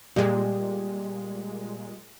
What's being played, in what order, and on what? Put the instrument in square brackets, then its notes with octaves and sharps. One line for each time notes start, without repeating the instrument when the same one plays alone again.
[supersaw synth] A#2 G#3 [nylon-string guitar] G3